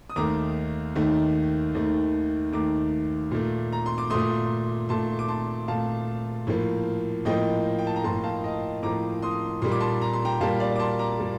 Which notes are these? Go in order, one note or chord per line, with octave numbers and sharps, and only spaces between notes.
D#6
D#2 D#3 A3 A#5 D6
D#2 D#3 A3
D#2 D#3 A3
D#2 D#3 A3 A#5 D6
A#2 A3
A#5
C6
D6
A#2 A3 C6 D#6
A#2 A3 A5 C6
D6
A5 C6
A#2 A3 F5 A5
A2 F3 A#3
A2 F3 A#3 D#5 G5
G5
A5
A#5
A2 F3 A#3 A5 C6
F5 A5
D#5 G5
A2 F3 A#3 A#5 D6
C6 D#6
A#2 G3 A#3 C6
D6
A5 C6
A#5
C6
G5 A#5
A#2 G3 A#3 F5 A5
D5 F5
D6
A5 C6
A#5 D6
A#2 G3 A#3